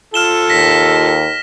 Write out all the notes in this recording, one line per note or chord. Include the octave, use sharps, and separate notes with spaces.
F4 A4 F6 E7 G7
D#2 A#6 B6